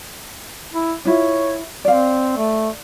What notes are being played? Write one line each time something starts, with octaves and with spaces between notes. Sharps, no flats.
E4
D4 E4 F4 C#5
C4 D5 F5
A3